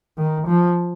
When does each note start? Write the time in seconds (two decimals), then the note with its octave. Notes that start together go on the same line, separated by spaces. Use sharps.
0.18 D#3
0.47 F3